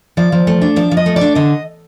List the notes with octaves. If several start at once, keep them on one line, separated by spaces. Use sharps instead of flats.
F3 D5
F3
A3
D4
F3 D5
F3
D#5
A3
D5
D4
D3 D#5